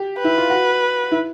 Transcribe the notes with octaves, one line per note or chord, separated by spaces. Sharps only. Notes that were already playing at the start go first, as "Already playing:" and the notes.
Already playing: G4
B4
E4
F4
F#4
E4